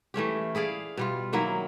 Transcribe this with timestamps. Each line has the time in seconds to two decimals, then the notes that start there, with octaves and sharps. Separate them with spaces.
0.14 E3 A3 C#4 G4
0.55 E4 G#4 D5 F5
0.97 B2 G3 F4
1.33 D#3 F#3 A#3 E4